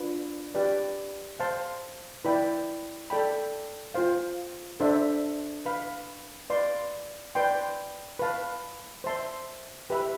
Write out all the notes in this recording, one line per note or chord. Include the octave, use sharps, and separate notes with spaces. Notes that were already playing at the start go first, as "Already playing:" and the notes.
Already playing: D4 F4 B4
G4 B4 D5
C5 F5 A5 C6
E4 B4 D5 G5 B5
A4 D5 G5 B5
F4 C5 F5
D4 A4 C5 E5
B4 F5 B5
B4 D5 F5 C6
B4 D5 G5 C6
B4 F5 A5
C5 E5 A5 C6
G4 B4 E5 B5